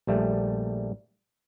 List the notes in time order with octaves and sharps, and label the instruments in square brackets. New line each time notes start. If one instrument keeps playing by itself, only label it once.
[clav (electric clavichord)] A#1 G3 A3